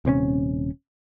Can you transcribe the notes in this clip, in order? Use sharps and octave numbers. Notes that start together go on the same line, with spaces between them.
D#1 C3 C4 C#4